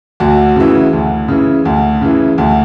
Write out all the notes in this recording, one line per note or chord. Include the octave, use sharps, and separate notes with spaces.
D2 F#4
C#3 E3
D2
C#3 E3
D2
C#3 E3
D2